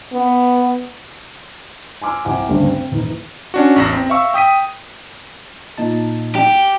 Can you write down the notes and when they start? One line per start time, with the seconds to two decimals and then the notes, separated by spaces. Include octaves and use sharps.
0.13 B3
2.02 G#5 C6 D6 E6 F6
2.25 C2 C3 F#5 G#5 D6
2.49 D2 G2 C#3 G3 A3
2.67 C4
2.92 D#1 E3 D#4 B4
3.54 C#4 D4 F#4
3.76 A1 E2 A#6
3.92 C4
4.10 E5 F5 C#6 E6
4.34 G5 D#6 B6 D#7
5.78 A#2 D#4 A5
6.36 G4